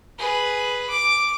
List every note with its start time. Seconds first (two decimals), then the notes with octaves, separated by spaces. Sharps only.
0.18 G#4 B4
0.90 D6